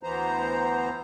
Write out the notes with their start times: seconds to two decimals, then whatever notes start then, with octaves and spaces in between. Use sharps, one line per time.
0.03 D2 E3 B3 C5 A#5